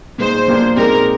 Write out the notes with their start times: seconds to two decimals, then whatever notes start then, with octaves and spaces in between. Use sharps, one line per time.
0.18 A#2 G#3 D#4 C5
0.48 A#2 F3 A#3 D4 G4
0.77 A#2 G#3 C4 D#4 G4 A#4